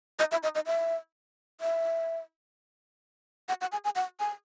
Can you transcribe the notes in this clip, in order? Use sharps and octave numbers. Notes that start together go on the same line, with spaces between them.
D#5
E5
D#5
D#5
E5
E5
F#5
F#5
G#5
G#5
F#5
G#5